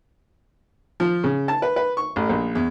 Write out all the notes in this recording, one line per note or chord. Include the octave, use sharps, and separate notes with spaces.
F3
C#3
A5
B4
B4
C#6
A1
A#1
E2